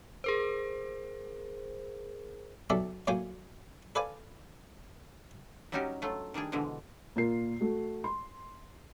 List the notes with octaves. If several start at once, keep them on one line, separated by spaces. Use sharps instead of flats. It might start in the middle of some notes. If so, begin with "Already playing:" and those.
G#4 A#4 C5
B1 F#3 A4 D5 E5
A2 F#3 A#3 F4 G5 G#5
A4 B4 C5 D5 F5 G#5
F#3 G3 C#4 D#4 F#4 G4
F#3 A3 F4
D#3 G3 D4 G#4
B2 D3 E3 F3 G#3
A#2 F4 A#4 C7
A3 F#4
C6